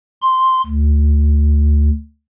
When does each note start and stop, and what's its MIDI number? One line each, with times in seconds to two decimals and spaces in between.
0.22 0.61 84
0.66 1.89 38